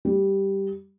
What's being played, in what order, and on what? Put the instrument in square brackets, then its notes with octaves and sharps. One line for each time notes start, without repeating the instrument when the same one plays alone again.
[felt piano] G3